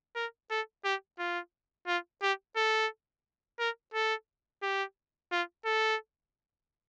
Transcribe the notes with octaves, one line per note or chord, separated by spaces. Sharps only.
A#4
A4
G4
F4
F4
G4
A4
A#4
A4
G4
F4
A4